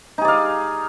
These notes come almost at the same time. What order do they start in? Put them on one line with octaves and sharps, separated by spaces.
D#4 G#4 D5 F5